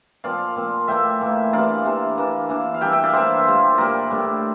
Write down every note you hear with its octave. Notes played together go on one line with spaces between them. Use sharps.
A#2 F3 C4 D5 F5
A#2 F3 C4
A2 E3 A#3 E5 G5
A2 E3 A#3
C3 E3 A#3 D4 D5 F5
C3 E3 A#3 D4
E3 A#3 D4
E3 A#3 D4
F5
E3 G3 A#3 D4 E5 G5
E5 G5
D5 F5
E3 G3 A#3 D4 C5 E5
A#2 G3 A#3
A#2 G3 A#3 A#4 D5
A2 G3 D4